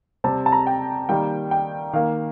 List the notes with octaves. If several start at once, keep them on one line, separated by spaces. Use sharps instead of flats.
C3 G3 C4 A5
A5
A#5
G5
D#3 G3 A#3 G5
G5
D#3 A#3 F5